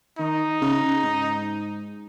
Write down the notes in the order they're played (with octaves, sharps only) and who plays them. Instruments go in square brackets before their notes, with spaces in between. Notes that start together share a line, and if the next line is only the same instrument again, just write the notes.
[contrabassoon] D#3 [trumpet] D#4
[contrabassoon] C#3
C#3
G#2